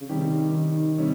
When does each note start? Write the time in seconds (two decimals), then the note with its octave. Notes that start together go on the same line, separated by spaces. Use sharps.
0.01 C#3
0.09 C3 D#3 G3 C#4 G4
0.53 D#3
0.98 C3 D#3 G3 C#4